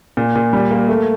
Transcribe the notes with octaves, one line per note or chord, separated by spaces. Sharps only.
A#2
A#2
G3
A#3
A3